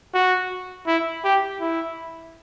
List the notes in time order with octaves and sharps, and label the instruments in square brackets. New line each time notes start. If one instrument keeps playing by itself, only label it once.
[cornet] F#4
E4
G4
E4